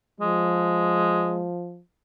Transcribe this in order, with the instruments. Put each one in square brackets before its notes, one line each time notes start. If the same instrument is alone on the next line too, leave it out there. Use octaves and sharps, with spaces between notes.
[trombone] F3 [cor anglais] G#3